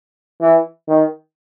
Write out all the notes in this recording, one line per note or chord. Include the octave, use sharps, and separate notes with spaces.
E3
D#3